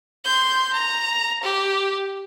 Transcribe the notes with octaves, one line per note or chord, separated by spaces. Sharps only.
C6 G6
A#5
G4